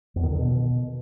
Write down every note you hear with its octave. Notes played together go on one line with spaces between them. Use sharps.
E2
D#3
D3
B2